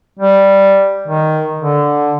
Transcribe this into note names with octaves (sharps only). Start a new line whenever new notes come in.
G3
D#3
D3